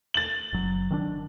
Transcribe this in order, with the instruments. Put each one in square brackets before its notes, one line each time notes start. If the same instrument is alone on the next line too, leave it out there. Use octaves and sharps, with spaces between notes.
[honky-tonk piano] A6 F#7
[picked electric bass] F#1 F#3
D#3 C4 D4